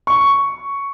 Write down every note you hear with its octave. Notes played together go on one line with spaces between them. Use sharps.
C#6